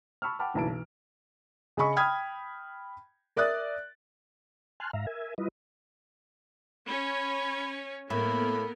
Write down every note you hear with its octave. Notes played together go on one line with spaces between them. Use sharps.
A5 B5 C#6 E6 F6
F#5 G5 A5 B5 D6 F6
F#1 B1 E3 A5 D7
E3
C#3 D#5 B5 C#6
G5 B5 D#6 F6 G#6
A#4 D5 E5 D#6 F#6 A6
G#5 A5 C6 F6 F#6
G#2 E5 F5 A#5
A#4 E5 G#5
G3 E4 F4 B4 D#5
C#4 C#5 B5
A2 A#3 B3 A#4 B5